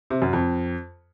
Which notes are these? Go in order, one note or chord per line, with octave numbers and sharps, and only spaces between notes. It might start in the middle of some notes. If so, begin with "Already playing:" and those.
C3
F#2
F2